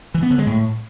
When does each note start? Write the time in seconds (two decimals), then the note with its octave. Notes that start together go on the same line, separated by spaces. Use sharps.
0.14 E3
0.23 B3
0.31 D3
0.39 G#3
0.47 A2